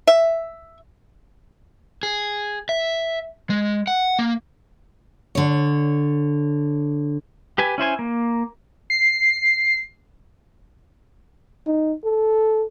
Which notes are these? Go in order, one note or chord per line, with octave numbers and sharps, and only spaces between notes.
E5
G#4
E5
G#3
F#5
A#3
D3 C#5
G4 B4 G#5
C#4 E4 C5 G#5
A#3
C7
D#4
A4